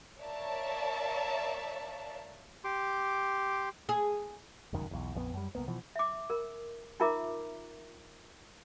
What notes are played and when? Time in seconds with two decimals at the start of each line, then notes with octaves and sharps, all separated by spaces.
0.20 A#4 C#5 D5 E5 F5 A5
2.64 G4 C6 D6
3.89 G#4
4.73 F1 C#2 F#2 D#3
4.91 B1 E2
5.14 A#1 F2 F3 B3
5.34 F#2 G3
5.55 C2 G#2 A#3 B3
5.68 B2 E3 F3
5.96 E5 D6
6.30 A#4
7.00 D#4 F4 A#4 E5 A#5 D6